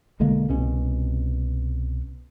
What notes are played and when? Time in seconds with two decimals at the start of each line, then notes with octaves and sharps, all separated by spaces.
0.20 B1 D3 G#3 A#3
0.49 C2 B2 C#4